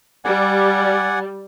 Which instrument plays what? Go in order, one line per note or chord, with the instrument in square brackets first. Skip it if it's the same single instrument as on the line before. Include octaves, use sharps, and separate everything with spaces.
[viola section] G3 [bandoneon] D5 F#5 G#5